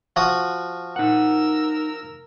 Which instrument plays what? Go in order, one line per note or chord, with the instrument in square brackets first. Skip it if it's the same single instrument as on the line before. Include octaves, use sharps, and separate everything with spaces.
[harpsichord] F3 F#4 D#6
[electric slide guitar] D#4 F#5 [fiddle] A#4 E6